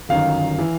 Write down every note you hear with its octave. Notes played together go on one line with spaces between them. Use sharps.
G1 F#2 D#3 F5
E3